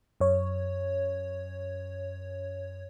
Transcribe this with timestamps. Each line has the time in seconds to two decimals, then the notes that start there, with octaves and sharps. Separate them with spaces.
0.20 F#2 C#5